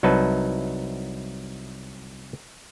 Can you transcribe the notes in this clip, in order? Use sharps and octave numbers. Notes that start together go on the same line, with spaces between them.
C2 F#3 D#4 B4 A5